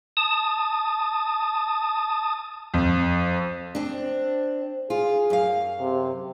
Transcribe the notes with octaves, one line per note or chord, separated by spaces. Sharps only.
A5 D#6
F2
C4 D4
F4 G#4
F#2 F5
C3